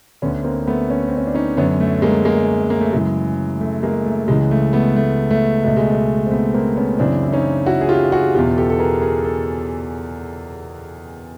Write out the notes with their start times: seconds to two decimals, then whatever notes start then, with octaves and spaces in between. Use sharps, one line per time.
0.22 D2 D3 B3 C#4
0.44 A#3 C4
0.67 A3 B3
0.90 B3 C#4
1.08 C4
1.17 C#4
1.27 D4
1.34 C#4 D#4
1.57 F#2 D3 B3 C#4
1.80 A3
2.02 G#3 A#3
2.25 G#3 A#3
2.70 A#3
2.81 A3
2.93 F#2 C#3 E3 G#3
3.61 A3
3.83 G#3 A#3
4.06 A3
4.28 C#2 C#3 E3 G#3
4.51 A3
4.73 A3 B3
4.96 A3
5.31 A3
5.64 C#2 B2 A3
5.77 G#3
5.90 A3
6.27 C4
6.31 A3 B3
6.54 A#3 C4
6.76 B3 C#4
6.99 F#2 C#3 E3 C4 D4
7.23 E4
7.32 C#4 D#4
7.66 E4 F#4
7.81 G#4
7.89 F4 G4
8.12 F#4 G#4
8.35 B2 F4 G4
8.38 E2
8.57 G4 A4
8.70 A4
8.79 G#4 A#4
9.02 G#4 A#4
9.25 A4